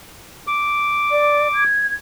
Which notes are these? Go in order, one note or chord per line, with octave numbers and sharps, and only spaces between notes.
D6
D5
G#6